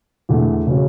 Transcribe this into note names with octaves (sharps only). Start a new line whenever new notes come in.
E2 D3 A3
C#3 F#3 C#4